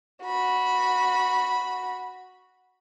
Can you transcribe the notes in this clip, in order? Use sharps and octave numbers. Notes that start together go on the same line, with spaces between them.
F#4 B5